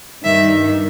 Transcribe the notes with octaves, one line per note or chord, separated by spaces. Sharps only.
G2 D#3 G3 E5